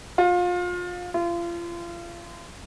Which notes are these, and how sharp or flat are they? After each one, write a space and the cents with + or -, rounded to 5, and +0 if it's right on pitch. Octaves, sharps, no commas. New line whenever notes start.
F4 +25
F4 -35